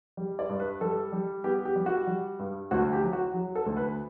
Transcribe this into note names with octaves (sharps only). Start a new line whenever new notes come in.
G3
D5
G2
B4
G3 A4
G3
B3 G4
G4
G3
F#4
G3
G2
D2 F#4
G4
F#3
F#4
F#3
A4
D2
B4